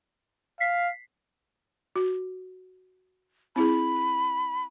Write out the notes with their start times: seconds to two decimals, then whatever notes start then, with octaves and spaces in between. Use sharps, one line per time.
0.60 F5 B6 C7
1.96 F#4
3.56 C4 E4 G#4 B5